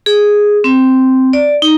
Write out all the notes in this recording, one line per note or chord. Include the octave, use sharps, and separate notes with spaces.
G#4
C4
D5
D#4